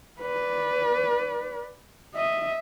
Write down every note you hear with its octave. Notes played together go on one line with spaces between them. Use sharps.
B4 D5
D#5 E5